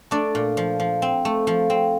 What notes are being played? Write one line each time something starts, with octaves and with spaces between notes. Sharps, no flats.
A3 D4 D5
A#2
F3
F3
C4
A3
F3
C4